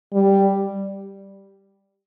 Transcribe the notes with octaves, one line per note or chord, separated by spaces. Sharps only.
G3